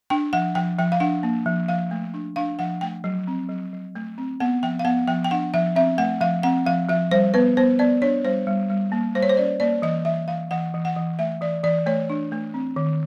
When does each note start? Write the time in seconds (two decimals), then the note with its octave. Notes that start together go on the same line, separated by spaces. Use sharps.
0.10 D4 G5
0.33 F3 F#5
0.55 F3 G5
0.79 F3 G5
0.92 F5
1.00 D4 F#5
1.23 A#3
1.46 F3
1.68 F3 F5
1.91 A3
2.14 D4
2.36 D4 F5
2.59 F3 F#5
2.81 A3 G5
3.04 F#3
3.27 C4
3.49 F#3
3.73 F#3
3.95 A3
4.18 C4
4.40 B3 F#5
4.63 F3 G5
4.79 F5
4.85 B3 F#5
5.07 F3 G5
5.24 G5
5.31 D4 F#5
5.54 F3 E5
5.76 C4 E5
5.98 A3 F#5
6.21 F3 F5
6.43 C4 F#5
6.66 F3 F5
6.89 F3 E5
7.11 G3 C5
7.34 B3 B4
7.57 B3 C5
7.79 B3 D5
8.02 D4 C#5
8.25 G3 C5
8.47 G3
8.70 G3
8.92 A#3
9.15 G3 C5
9.23 C#5
9.29 C5
9.37 C#4 D5
9.60 A#3 D5
9.82 E3 D#5
10.05 E3 E5
10.28 E3 F5
10.51 E3 F#5
10.74 E3
10.85 F#5
10.96 E3
11.19 A3 E5
11.41 E3 D5
11.63 E3 D5
11.86 A3 C#5
12.10 D4
12.32 A3
12.54 C4
12.76 D#3